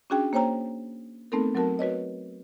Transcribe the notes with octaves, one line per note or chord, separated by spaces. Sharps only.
C#4 D4 F#4 G#4 G5
A#3 C5 C#5 G5 A#5
A3 B3 C4 D#4 A4 A#4
F#3 C4 F#4 A#4 A5
F#4 B4 C#5 D#5